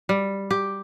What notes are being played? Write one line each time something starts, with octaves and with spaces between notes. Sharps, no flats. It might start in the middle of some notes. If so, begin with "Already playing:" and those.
G3
G4